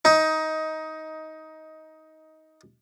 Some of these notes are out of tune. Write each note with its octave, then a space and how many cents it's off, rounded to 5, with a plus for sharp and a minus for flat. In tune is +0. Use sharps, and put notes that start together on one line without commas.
D#4 +15